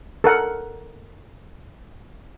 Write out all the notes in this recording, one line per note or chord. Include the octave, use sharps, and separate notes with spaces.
A4 A#4 F#5